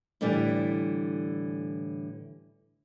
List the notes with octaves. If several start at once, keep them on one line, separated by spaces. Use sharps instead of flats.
A2 D3 E3 G3